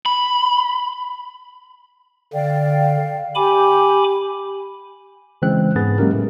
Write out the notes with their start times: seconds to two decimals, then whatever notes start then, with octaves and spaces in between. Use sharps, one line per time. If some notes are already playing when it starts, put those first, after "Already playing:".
0.06 B5
2.33 D3 D5 F5 G5
3.35 G4 G#5 B5 D6
5.42 C#3 E3 G#3 C4 F#6
5.75 G#2 B3 G#4 B4 A6
5.98 F#3 G#3 A#3 C#4 G4 A#4
6.13 A2 A3